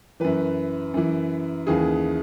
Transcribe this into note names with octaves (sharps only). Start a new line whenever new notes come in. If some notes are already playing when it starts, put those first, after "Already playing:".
F#2 E3 B4
F#2 E3
D#2 C#3 E3 G#4